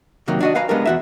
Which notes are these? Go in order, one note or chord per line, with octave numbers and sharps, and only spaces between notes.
C3 D#3 F#3 A#3
D4 F#4 D#5
B4 F5 G#5 A#5
G#3 B3 D4 G4 A#4
E2 F#4 E5